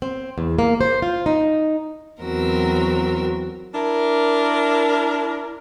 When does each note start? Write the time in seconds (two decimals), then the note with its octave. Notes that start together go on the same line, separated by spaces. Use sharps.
0.02 C4
0.38 E2
0.59 A#3
0.81 C5
1.02 F4
1.26 D#4
2.20 E2 F#3 C4 F#4 A#4 E6
3.74 D4 E4 A#4